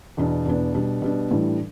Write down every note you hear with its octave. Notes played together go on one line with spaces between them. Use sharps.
E2 B2 B3 D4
E2 B2 B3 D4
B2 G3 D4
B2 G3 D4
A2 E3 G3 D4